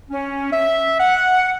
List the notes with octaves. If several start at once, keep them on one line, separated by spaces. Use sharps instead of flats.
C#4
E5
F#5